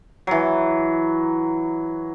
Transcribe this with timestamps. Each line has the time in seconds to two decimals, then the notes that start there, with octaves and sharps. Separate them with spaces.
0.27 E3 F#3